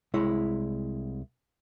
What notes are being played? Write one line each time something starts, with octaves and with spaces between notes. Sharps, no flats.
C2 G#3 E4 C#5